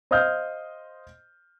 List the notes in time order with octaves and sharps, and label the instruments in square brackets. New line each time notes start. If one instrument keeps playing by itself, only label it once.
[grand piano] C5 D#5 F5 D#6 F6 G6